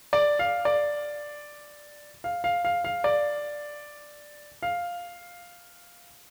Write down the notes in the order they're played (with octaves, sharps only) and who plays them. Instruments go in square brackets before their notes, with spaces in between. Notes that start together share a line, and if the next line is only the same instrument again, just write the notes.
[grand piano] D5
F5
D5
F5
F5
F5
F5
D5
F5